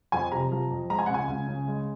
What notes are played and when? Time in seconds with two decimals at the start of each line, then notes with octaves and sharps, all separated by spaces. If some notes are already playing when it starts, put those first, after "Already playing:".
0.12 F2 G#5
0.32 C3 A#5
0.52 F3
0.71 F2
0.90 G#3 A#5
0.99 G#5
1.06 C#2 F#5
1.14 G#5
1.29 C#2
1.48 C#3
1.68 G#3